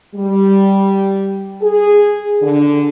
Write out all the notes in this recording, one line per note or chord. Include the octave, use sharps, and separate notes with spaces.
G3
G#4
D3